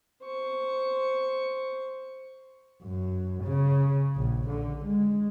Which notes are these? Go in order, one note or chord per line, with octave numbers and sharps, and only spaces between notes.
C5 C#6
F#2
C#3
A#1
D3
G#3